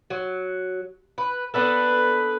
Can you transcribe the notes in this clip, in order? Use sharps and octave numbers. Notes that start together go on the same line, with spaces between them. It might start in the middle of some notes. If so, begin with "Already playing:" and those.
F#3
B4
B3 D4 A4 B4